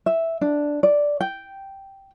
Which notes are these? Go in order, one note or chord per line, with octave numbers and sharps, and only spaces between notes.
E5
D4
D5
G5